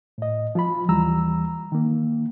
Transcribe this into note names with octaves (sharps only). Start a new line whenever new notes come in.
A2 D#5
F3 F4 B5
D#2 E3 G3 A#5 E6
D#3 A#3